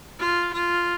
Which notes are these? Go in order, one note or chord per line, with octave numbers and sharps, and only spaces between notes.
F4
F4